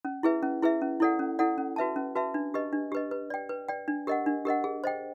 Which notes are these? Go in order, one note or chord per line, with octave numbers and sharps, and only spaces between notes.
C#4
E4 G#4 B4 E5
C#4
E4 G#4 B4 E5
C#4
E4 A4 D5 F#5
C#4
E4 A4 D5 F#5
C#4
F#4 B4 E5 A5
C#4
F#4 B4 E5 A5
D4
G4 B4 D#5
D4
G4 B4 D#5
B4
D5 G5
B4
D5 G5
D4
G4 A#4 D#5 F#5
D4
G4 A#4 D#5 F#5
G#4
C5 D#5 G5